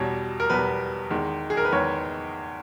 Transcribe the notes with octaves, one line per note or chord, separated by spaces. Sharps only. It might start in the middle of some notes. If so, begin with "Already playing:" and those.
Already playing: E2 B2 G3 C#5
A#4
E2 B2 G3 B4
E2 D#3 G#3
G#4
A#4
B4
E2 D#3 G#3 C#5